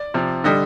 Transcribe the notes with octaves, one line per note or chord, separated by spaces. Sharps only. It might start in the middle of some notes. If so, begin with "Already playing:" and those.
Already playing: D5
C3 F3
D3 G3 D#5